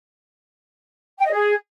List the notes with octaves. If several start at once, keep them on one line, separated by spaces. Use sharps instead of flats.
G5
D#5
G#4